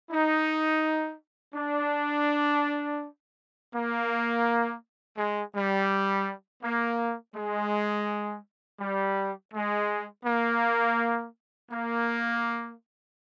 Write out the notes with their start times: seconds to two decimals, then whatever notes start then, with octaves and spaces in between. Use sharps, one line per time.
0.10 D#4
1.54 D4
3.73 A#3
5.17 G#3
5.54 G3
6.63 A#3
7.35 G#3
8.80 G3
9.53 G#3
10.25 A#3
11.71 A#3